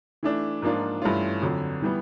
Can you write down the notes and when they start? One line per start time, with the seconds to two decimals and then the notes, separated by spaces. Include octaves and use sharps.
0.23 E3 A3 D4
0.62 G#2 F3 A#3 D4 F4
1.02 G2 E3 A3 C#4 F4
1.42 F2 D3 F#3
1.82 E3 G3 B3